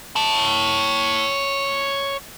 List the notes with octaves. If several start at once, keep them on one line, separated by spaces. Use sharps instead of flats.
C#5 A5